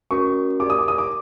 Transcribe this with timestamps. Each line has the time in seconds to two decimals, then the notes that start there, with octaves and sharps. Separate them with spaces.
0.11 A3 C#4 F#4 A#4 C#6
0.60 G4 A#4 D5 D6
0.70 D#6
0.79 D6
0.88 D#6
0.98 D6